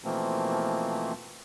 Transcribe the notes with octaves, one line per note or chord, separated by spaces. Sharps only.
B2 E3 F3 A3 A#3 C4